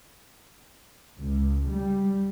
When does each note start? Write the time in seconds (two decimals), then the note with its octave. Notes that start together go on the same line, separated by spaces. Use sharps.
1.17 C#2
1.70 G3